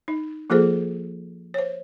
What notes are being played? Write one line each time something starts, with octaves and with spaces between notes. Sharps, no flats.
D#4
F3 A#3 F4 G#4 A4 C5
C5 C#5